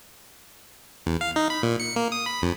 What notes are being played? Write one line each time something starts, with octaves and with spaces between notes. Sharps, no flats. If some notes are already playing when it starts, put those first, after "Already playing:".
E2
F5
D#4
B5
A#2
C#7
A#3
D#6
B5
F2